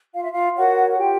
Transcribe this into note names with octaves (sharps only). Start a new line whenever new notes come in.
F4 F5
E5
F4 F5
F#4 A#4 C#5 F#5
F#5
F4 G4 G5